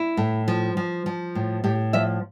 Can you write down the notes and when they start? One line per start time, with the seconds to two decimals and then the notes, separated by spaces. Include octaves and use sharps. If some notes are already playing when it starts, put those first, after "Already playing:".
Already playing: E4
0.17 A2
0.48 F3
0.77 F3
1.06 F3
1.35 A2
1.64 A2 G4
1.93 F3 E5